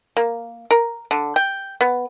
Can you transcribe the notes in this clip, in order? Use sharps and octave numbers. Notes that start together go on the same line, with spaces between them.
A#3
A#4
D3
G5
B3